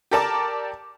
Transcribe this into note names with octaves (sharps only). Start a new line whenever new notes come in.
G4 A4 A#4 D5 A5 D6